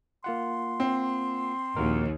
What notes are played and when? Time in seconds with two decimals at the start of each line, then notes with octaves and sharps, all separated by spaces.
0.24 A#3 F4 F#5 C6
0.80 C4
1.76 A#1 D#2 F#4 A#4